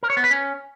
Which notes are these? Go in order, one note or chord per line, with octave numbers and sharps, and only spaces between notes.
A#4
C#5
B3
B4
C#4